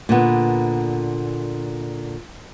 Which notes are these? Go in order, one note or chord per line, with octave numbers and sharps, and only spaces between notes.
A#2 D3 B3